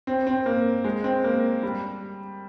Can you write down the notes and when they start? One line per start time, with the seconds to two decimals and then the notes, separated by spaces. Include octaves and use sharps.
0.07 C4
0.27 C4
0.46 A#3
0.84 G#3
1.04 C4
1.24 A#3
1.63 G3